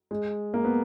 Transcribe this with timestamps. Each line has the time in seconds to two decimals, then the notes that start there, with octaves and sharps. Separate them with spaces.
0.11 G#3
0.54 A#3
0.65 B3